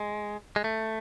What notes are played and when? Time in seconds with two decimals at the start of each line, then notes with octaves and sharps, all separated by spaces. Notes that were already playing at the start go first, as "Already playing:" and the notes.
Already playing: G#3
0.56 G#3
0.64 A3